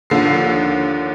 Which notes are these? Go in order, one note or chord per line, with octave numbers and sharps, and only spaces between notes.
D#2 D3 F3 C7